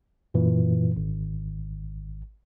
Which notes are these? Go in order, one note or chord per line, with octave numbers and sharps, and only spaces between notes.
F#2 A#2 E3
G#1